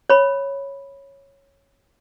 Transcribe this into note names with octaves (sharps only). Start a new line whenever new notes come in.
C#5 B5